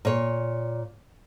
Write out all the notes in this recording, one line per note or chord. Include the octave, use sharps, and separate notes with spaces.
A#2 C#5